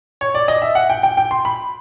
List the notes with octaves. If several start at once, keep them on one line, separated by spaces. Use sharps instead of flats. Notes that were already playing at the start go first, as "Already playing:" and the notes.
C#5
D5
D#5
E5
F#5
G5
G5
G5
C6
B5